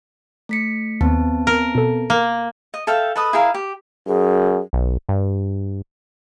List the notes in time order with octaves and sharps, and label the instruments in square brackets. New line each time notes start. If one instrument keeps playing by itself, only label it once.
[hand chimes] A3 B6 C#7
[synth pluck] D#2 [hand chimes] B3 C4 A5
[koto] A#4
[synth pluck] B2 A4
[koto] A#3
[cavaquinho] D#5
A4 E5 F5 G5
A4 B4 D#5 D#6
E4 G#4 A#4 F5
G4
[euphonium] F#2 [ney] G#4
[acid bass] B1
G2